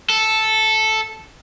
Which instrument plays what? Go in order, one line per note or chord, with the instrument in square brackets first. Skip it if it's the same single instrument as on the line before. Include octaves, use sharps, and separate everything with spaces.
[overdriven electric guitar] A4